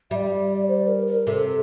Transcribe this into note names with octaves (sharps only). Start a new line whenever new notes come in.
G3 D5 E5
C5
A#4
A#4
C3 A4